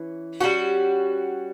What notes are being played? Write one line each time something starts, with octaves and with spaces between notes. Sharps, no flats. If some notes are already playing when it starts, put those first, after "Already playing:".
Already playing: E3 C#4
G3 C#4 F#4